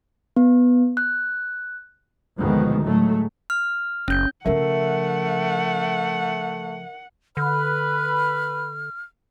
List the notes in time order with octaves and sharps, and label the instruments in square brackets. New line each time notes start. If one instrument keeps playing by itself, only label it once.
[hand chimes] B3
F#6
[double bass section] D2 B2 D#3 F3 G#3
A2 F#3 G#3 A3
[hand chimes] F6
[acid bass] F#1 [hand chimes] C#4 G6
[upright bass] C#3 F3 [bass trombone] A3 [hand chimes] A#4 E5 [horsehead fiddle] F#5
[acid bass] D3 [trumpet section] B4 [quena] F6